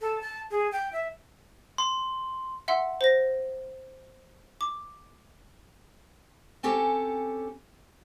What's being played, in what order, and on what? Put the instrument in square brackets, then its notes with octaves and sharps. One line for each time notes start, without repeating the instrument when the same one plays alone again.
[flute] A4
A5
G#4
G5
E5
[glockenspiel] C6
[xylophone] E5 F#5 C6 E6
C5 A#6
D6
[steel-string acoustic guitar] C4 C#4 G4 A4